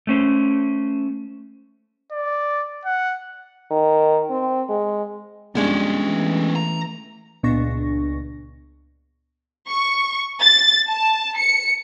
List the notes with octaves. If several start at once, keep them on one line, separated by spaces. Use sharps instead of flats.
A3 C#4 C5
D5
F#5
D#3
C4
G#3
F2 G3 G#3 B3 C#4 D4
E3 A3
A#5
C#2 A#2 B3 D4 C#6 A#6
C#6
A6
A5
C#7